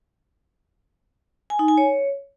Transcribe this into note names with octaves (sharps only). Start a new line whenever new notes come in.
G#5
D#4
G#5
C#5